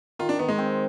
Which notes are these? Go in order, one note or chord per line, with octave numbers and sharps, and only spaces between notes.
D#3 F4
D4
D#3 B3
G#3
C4